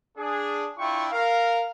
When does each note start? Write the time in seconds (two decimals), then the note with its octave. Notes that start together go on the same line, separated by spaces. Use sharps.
0.18 D4 G#4
0.79 D4 E4 F4 G5 C#6
1.12 A#4 F5